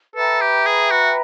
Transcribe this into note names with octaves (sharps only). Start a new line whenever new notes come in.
A4 B4 E5 G5 A#5
G4
G#4
F#4